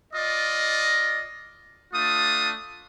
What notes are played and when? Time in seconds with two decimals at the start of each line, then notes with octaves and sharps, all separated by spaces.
0.13 F4 D5 D#5
1.93 A3 D4 F4 D#6